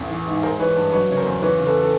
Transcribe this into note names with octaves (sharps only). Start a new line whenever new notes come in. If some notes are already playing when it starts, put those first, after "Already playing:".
Already playing: A1 E2
E3
G#2
G#3 A#4 C5
E3 B4 C#5
G2
F#3 B4 C#5
C#3 C#5
A#4 C5
E2
E3 B4 C#5
C#3
A4 B4
A4